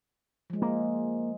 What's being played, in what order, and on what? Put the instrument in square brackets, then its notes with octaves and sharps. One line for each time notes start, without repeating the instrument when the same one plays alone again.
[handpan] F3 G#3
[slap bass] A#3